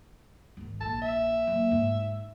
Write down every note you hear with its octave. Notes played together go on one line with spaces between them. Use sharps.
G#2 D#3
A#1 A5
E5
F#3 A#3
G#2